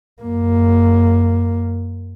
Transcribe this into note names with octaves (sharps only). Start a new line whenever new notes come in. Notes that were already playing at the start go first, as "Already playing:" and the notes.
F#2 A#3